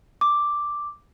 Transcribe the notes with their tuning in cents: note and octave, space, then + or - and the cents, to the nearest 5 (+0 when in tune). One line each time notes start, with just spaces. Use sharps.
D6 +0